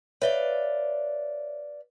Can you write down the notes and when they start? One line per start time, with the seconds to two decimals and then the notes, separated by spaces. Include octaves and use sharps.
0.22 B4 C#5 D5 E5 F5 G7